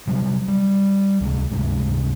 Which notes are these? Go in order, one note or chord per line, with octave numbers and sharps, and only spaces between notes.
C3 F#3 G3
G3
C#2 C3 D#3 A3
C#2 G2 C3 G#3